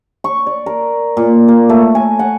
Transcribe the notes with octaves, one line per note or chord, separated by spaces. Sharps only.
C#6
D5
A#4
A#2
A#3
A3
G#5
F#5